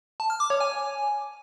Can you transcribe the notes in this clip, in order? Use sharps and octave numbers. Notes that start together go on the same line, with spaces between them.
A5
F6
D6
C#5
G#5